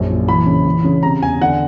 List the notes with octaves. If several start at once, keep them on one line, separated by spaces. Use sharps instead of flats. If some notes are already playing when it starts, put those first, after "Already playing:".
Already playing: A#1 F#2
A#2
E3 B5
C#3
E3
C#3
C3 A#5
E2 G#5
D3 F#5